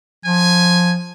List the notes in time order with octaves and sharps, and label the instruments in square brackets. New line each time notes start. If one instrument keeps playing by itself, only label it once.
[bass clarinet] F3 [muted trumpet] G#5